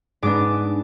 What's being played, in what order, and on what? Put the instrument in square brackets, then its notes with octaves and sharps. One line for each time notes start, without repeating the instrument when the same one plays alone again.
[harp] G#2 G#3 B3 D4 D6